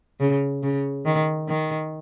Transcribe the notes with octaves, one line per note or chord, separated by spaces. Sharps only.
C#3
C#3
D#3
D#3